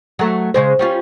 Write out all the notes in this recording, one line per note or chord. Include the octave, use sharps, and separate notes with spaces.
F#3 A3
C#3 G#3 C5
G3 C#4 F4